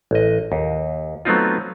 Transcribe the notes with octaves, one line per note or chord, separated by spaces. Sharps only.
A1 D#5
D#2
F#3 A3 B3 C4 D#4 F4